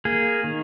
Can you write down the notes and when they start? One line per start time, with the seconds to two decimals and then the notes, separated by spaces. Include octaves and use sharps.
0.05 A#3 G#4
0.44 D#3